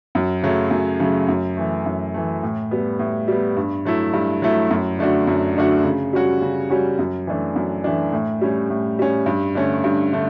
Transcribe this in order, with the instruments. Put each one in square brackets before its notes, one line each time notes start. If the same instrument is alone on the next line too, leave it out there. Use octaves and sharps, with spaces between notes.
[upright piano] F#2
C#3 F#3 A3
F#2
C#3 F#3 A3
F#2
E3 A3
F#2
E3 A3
A2
G3 B3
A2
G3 B3
G2
F#3 A3 E4
G2
F#3 A3 E4
F#2
D3 A3 D4 F#4
F#2
D3 A3 D4 F#4
C#3
G3 C#4 F#4
C#3
G3 C#4 F#4
F#2
E3 A3 D4
F#2
E3 A3 D4
A2
G3 C#4
A2
G3 C#4
G2
D3 A3 C#4
G2
D3 A3